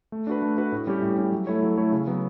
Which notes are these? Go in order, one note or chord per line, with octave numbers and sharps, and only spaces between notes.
A3
D4 F#4 B4
A3
D4 F#4 B4
A2
G3 C#4 G4
A2
G3 C#4 G4
F#3
A3 E4 A4 C#5
F#3
A3 E4 A4 C#5
C#3
F#3 B3